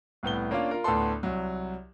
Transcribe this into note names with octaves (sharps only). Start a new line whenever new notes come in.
C2 A2 B3 G7
A#3 C#4 D4 F4 D5 F5
F4 A#4
D2 A2 B3 D4 A4 C6
C2 F#3